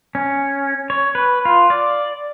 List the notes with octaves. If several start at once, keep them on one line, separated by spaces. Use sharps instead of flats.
C#4
C#5
B4
F4
D5